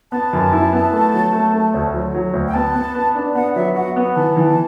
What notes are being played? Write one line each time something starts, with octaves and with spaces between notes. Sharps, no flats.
B3 A5
F#2
E4
B3
A3
F#3
A3
A3
D2
F#3
F#3
D2
G5
B3 A5
B3
B3
D4
B3 F#5
F#3 E5
F#4 F#5
B3
E3 A5
E3